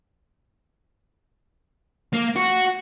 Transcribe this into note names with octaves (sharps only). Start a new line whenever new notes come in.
A#3
F#4